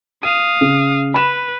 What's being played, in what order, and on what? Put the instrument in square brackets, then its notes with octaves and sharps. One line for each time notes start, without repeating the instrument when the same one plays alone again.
[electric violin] F5 D#6 [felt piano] D#7
[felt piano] C#3
[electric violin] B4 [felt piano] B5 E7